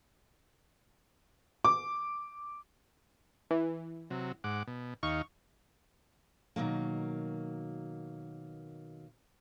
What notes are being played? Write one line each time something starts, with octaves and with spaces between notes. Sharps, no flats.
D6
E3
C3 F#3
G#2 F#5 D6
B2
D#2 D#4 F5 C#6
B2 D#3 F#3 A#3